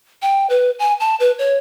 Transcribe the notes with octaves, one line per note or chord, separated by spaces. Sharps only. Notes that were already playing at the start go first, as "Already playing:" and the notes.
G5
B4
G#5
A5
B4
C#5